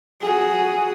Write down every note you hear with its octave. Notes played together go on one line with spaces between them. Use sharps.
F#4 G#4